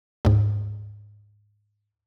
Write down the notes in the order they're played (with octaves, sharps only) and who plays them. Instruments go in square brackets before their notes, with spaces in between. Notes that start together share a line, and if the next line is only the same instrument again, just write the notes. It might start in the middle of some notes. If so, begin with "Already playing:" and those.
[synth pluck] D2 G#2